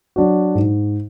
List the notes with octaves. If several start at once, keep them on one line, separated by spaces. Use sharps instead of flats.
F#3 D4 F#4
G#2